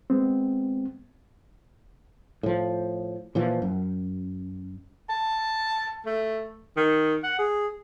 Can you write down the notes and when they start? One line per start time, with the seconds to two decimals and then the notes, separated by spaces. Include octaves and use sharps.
0.10 G#3 B3 C4
2.43 A2 F3
3.35 A#2 E3 F3
3.62 F#2
5.09 A5
6.06 A3
6.77 D#3
7.24 F#5
7.39 G#4